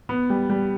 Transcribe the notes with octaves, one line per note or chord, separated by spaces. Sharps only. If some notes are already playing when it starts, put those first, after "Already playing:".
B3
G3
G3